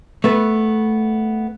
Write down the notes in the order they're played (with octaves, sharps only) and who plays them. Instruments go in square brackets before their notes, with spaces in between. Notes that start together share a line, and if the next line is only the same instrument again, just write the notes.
[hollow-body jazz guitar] A3 B3 B4